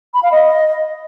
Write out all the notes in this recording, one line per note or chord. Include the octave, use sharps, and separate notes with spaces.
B5
F5
D#5